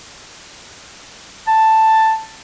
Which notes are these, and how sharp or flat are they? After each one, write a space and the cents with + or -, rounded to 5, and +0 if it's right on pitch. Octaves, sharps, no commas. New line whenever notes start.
A5 +5